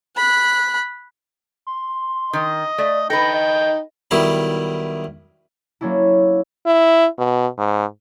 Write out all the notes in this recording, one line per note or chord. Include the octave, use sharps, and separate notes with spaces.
B5 F#6
C6
D#3 D#5
A3 D5
D#4 A4 B4 G5 A#6
D#5
B1 D#3 G3 E4 B5
F#3 A#3 C#4 D4 E4
E4
B2
G#2